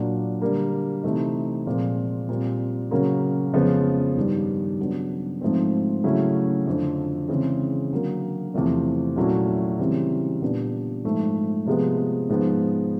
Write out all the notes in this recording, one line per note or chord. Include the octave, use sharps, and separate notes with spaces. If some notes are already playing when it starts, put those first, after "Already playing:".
Already playing: A#2 F#3 A#3 D4
D3 G3 A#3
C3 E3 A3 C4 D#4
A#2 F3 G#3 C4
A#2 G3 C4
C#3 F#3 A#3 C#4
F2 C#3 F3 G#3 B3
G2 D#3 G3
C#3 F#3 B3 D4
G#2 F3 A3 C4
C#3 F#3 A3 C#4 E4
F2 D3 F3
C#3 E3 G#3 C4
D3 F#3 A#3
E2 C3 F3 A3 C4
A#2 F#3 A3 C#4 E4
C#3 E3 G3 C4
A#2 G3 B3 D4
G#2 F3 A3
C3 F3 G#3 B3
G#2 F3 G#3 B3